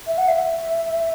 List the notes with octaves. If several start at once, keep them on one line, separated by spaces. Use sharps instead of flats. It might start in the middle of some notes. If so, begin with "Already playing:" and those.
E5
F#5
E5